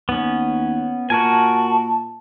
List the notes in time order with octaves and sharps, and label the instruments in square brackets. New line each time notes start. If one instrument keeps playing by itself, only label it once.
[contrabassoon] D#2 [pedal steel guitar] B3 C#4
[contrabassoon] A#2 [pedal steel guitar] F#4 A#4 G#5 [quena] A5